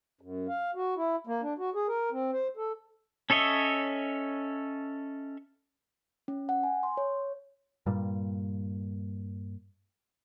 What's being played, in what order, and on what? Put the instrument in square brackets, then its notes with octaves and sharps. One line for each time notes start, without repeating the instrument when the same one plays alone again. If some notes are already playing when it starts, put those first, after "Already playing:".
[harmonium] F#2
F5
F#4
E4
A#3
D4
F#4
G#4
A#4
C4
C5
A4
[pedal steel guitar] C#4 A4 C#5 D#5 E5
[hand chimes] C#4
F#5
G#5
C6
C#5
[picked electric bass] G2 A#2 G3